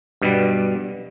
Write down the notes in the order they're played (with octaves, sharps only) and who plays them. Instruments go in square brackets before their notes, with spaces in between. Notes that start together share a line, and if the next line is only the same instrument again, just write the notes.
[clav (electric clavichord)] G2 B2 G3